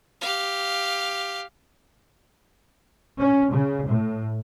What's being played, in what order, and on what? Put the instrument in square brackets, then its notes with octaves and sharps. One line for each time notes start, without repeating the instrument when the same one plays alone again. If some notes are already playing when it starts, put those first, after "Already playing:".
[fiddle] G4 F5
[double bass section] C#4
C#3
A2